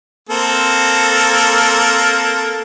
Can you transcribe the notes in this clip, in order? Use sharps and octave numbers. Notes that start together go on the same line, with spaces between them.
A#3 C4 A4